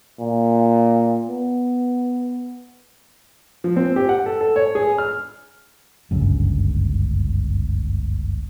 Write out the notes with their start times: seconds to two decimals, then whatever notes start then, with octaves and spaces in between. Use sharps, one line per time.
0.19 A#2
1.28 B3
3.64 F3
3.76 C4
3.96 G4
4.09 F#5
4.26 A4
4.41 A4
4.56 C#5
4.75 G#4
4.98 F6
6.11 G1 C#2 F#2